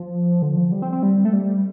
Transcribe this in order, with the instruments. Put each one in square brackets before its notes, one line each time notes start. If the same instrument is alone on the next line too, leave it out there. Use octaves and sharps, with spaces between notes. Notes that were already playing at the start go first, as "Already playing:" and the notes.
Already playing: [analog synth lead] F3
D3
F3
G3
C4
C4
G3
A3
G3